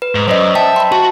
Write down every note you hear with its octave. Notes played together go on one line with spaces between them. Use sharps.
B4
G#2
F#2 C5 D5 D#5
E5 G5 A5
B5 C6
F#4 A5